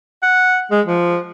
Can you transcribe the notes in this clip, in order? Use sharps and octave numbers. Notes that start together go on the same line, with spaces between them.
F#5
G#3
F3